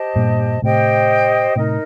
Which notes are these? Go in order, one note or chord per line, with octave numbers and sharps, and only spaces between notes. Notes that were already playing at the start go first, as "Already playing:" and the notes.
Already playing: G4 C5 D#5 A5
G2 A#2
A2 C3 G4 C5 D#5 G5
A2 C3 D#4 A#4 D#5